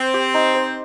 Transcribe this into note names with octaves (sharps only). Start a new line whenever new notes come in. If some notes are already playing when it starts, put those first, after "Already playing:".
Already playing: C4 C5
G4
D#4
C5